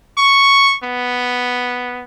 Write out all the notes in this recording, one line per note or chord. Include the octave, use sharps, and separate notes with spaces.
C#6
B3